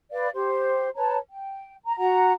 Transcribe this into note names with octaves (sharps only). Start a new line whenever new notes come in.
B4 D5 F5
G4 C5
B4 C#5 A5 A#5
G5
A#5
F#4 F#5 A#5